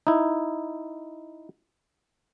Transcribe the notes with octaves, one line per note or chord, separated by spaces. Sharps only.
D#4 E4